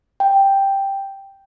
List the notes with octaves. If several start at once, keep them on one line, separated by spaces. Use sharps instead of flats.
G5